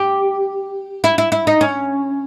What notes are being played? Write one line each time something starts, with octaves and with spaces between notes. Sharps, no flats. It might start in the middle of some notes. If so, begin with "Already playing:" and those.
Already playing: G4
E4
E4
E4
D#4
C#4